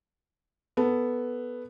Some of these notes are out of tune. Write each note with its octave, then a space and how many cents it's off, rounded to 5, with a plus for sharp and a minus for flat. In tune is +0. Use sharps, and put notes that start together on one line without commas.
B3 +0 A4 +0